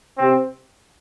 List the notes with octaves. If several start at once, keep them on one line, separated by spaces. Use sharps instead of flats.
C3 C4